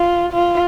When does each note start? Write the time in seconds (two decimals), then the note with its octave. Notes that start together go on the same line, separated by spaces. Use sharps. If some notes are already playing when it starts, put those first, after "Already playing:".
Already playing: F4
0.32 F4